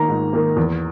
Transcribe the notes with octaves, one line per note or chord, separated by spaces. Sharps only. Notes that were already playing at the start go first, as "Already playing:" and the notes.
Already playing: D#3 A#3 A#5
G#2
D#3 A#3
E2